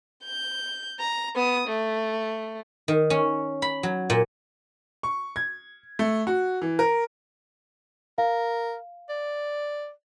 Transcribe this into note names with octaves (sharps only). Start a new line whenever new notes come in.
G6
A#5
B3 D#6
A3
D#3
C#4
B5
F#3
A#2
C#6
G#6
A3
F#4
E3
A#4
A#4 F5
D5